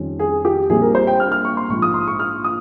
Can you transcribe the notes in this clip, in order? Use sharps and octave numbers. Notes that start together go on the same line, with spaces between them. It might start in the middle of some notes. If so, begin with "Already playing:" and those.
Already playing: F2 D#3 G3 C#4
G#4
G4
A#1 A#2 G3 C4 G#4
A#4
C5
G5
F6
F6
C#6
C6
A#1 G#2 F3 C#6
D#6
C6
C#6
F6
D#6